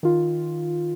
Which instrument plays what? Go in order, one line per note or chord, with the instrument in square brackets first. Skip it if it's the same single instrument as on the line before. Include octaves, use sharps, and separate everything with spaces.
[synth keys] D#3 F4